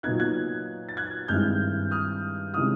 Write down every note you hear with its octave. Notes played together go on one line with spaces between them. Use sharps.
A#2 F#3 B3 D#4 F#6 G#6
F#6 G#6
A6
F#6 G#6
G2 D#3 G#3 C4 E4 F6 G6
D#6 F6
C3 D#3 G#3 C#4 E4 D#6 F6